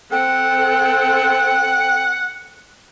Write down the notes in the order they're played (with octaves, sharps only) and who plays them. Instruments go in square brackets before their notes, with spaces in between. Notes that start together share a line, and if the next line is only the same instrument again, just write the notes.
[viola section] C4 A4 [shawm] F#5 [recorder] G5